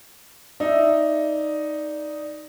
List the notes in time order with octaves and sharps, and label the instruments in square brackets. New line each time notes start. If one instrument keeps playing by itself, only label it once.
[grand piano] D#4 [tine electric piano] D5 [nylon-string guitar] E5